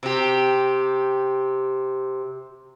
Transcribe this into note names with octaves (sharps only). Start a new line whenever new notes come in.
C3 G4